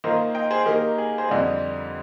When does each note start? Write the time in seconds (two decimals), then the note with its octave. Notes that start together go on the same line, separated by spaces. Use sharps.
0.04 D#3 A#3 F4 C5 D#5
0.35 D#5 G5
0.51 G#4 C5
0.66 D#3 A#3 D#4 G4 A#4
0.98 G#4
1.18 G#4 C5
1.29 F2 D3 G3 C5 D#5